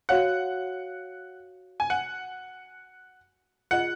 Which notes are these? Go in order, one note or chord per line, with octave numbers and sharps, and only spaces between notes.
F#4 C#5 F5 F#5
G#5
F#5
F4 G#4 D#5 F#5